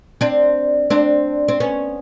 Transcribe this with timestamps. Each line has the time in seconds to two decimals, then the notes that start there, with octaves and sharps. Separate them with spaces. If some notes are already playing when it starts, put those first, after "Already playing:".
0.21 C4 D4
0.90 C4 D4
1.48 C4
1.60 B3 C#4